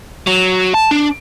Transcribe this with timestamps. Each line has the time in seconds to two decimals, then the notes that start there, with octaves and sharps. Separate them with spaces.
0.27 F#3
0.74 A5
0.91 D4